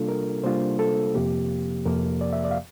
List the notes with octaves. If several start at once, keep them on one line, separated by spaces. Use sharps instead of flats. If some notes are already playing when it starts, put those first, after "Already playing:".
Already playing: C3 G3 A#3 D4 F4 A4
A#4
C3 G3 A#3 D4 F4 C5
A4
F2 C3 F3 A#3 G4
F2 C3 F3 A#3 A#4
D5
E5
D5
F5